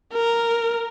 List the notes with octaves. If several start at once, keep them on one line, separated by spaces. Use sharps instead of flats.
A#4